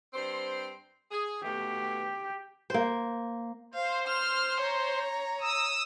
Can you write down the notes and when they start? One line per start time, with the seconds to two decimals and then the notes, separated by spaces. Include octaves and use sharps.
0.14 G2 C4 C5
1.11 G#4
1.43 B2 A3 G4
2.70 A#3 C5
3.74 C5 F5
4.07 F6
4.60 C#5 A#5
5.41 D#6 E6